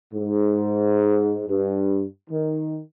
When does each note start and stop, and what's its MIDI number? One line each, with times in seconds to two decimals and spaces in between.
0.13 1.43 44
1.48 2.03 43
2.30 2.81 51